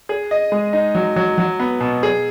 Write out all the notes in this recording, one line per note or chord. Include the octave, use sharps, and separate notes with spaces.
G#4
D#5
G#3
D#4
F#3
F#3
F#3
B3
B2
G#4